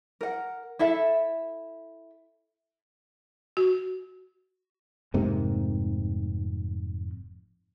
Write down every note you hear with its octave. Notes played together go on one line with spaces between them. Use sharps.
A#4 F#5
E4 A4 E5
F#4
F1 G#2 C3 A#3